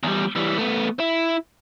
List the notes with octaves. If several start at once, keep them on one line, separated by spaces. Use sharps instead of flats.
E2 G3
E3 G3
A3 B3
E4